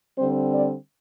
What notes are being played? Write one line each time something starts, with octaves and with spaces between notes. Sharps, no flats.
D3 G3 C4 C5
D5